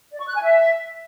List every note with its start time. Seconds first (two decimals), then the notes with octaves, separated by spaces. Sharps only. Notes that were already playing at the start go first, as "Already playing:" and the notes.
0.13 D5
0.20 C#6
0.27 F#6
0.34 G#5
0.42 E5